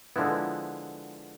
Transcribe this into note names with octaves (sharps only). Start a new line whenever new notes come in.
D3 F3 G#3 B3 E4